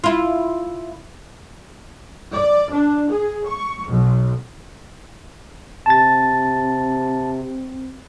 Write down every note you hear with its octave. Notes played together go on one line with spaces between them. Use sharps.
E4 F4
D5
D4
G#4
C#6
B1
C3 C4 A5 A6